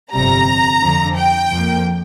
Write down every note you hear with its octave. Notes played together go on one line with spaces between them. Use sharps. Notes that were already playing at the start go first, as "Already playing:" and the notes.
G1 F2 C3 G3 A#5
F2 D3 F3
G5
F2 F3 A#3